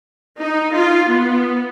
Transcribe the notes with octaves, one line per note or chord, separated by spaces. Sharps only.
D#4
F4
B3